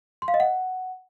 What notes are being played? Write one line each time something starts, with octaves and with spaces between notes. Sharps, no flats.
C6
F5
D#5
F#5